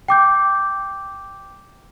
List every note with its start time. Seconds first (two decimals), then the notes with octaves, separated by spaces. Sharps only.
0.08 G5 D6 G6